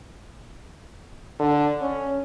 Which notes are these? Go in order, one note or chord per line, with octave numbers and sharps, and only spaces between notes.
D3
C#4